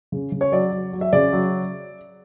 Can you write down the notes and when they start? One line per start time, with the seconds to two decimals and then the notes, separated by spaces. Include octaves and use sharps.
0.12 C#3
0.32 C#3
0.41 C#5
0.52 F#3 D5
0.72 F#3
0.93 F#3
1.01 E5
1.13 C#3 D5
1.33 F#3